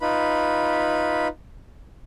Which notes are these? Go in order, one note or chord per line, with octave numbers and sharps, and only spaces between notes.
D#4 F4 B4 B5